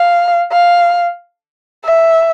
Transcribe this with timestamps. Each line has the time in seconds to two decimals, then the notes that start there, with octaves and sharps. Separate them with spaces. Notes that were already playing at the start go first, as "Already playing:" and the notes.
Already playing: F5
0.52 F5
1.84 E5